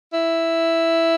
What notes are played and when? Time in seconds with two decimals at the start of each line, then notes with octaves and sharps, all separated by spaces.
0.13 E4